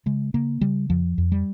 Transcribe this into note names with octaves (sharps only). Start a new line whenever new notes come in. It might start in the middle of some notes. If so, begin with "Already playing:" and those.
C#3 G#3
C#3 A#3
C#3 G3
F2 F3
F2
G3